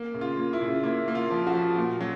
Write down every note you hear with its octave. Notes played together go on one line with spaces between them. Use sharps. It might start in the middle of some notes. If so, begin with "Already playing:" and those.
Already playing: A#3
C#3
F4
A#3
E4
C#3
A#3 E4
A#3
F4
F3
F#4
F3
A#2
F#3